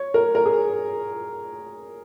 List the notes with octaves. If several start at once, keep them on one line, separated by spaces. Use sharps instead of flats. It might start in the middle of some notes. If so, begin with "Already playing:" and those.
Already playing: C#5
A#4
A#4
G#4